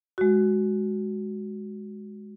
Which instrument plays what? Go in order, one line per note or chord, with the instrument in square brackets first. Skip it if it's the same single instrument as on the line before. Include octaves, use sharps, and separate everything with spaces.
[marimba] G#3 F#4